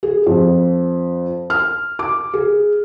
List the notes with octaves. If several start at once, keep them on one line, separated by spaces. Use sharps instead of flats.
G#4
F2
F6
D6
G#4